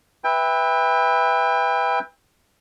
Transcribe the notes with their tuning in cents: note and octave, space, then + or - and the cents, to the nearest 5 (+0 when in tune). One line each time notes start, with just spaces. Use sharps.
B4 +0 E5 -10 G5 +30